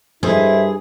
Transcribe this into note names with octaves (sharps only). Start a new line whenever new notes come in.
G2 E4 G#4 A4 C5 D#5